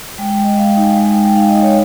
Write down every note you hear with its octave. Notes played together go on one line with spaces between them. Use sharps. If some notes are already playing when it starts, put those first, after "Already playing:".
G#3 G5
G5
G#3
D#5
G#3 F5
G5
D#4
G#5
G#3 G#5
G5
G#3
G5
D#4 F5
D#5
D#4
C#5